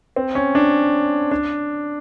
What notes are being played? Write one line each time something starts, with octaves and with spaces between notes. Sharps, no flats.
C4
C#4
D4
D4